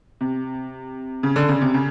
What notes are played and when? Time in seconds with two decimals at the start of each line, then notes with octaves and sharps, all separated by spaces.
0.21 C3
1.23 C#3
1.36 D3
1.49 C#3
1.61 C3
1.74 C#3